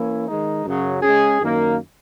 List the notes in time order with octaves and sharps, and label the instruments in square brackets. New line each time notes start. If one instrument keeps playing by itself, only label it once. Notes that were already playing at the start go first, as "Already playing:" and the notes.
Already playing: [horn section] E3 A#3 C#4 E4
D#3 G#3 D#4
F#2 C#3 F#3
G#3 C#4 G#4
F#2 D#3 A#3